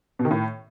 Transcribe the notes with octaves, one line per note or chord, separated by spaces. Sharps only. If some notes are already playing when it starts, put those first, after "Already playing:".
B2
D#3
A2